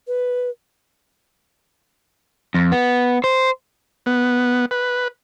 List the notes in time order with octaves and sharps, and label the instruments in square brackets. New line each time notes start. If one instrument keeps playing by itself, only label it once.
[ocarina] B4
[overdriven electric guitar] F2
B3
C5
[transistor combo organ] B3
B4